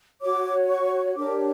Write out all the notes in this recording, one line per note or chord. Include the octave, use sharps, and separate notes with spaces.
F#4 C#5 D6
C#6
D4 G4 A#4 C#5 D6